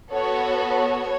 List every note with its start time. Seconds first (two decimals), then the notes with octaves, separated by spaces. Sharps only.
0.11 B3 F#4 A4 C#5
0.76 C#5